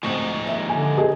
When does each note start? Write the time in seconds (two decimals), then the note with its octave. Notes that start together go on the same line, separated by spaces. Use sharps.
0.03 D2 G#2 F3 G#3 C4 D#4 C#6
0.47 D#2 E5
0.69 D3 G#5
0.97 G4 G#4 D#5